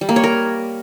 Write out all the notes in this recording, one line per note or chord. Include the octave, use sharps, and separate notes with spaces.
G3
A#3
C#5
A#4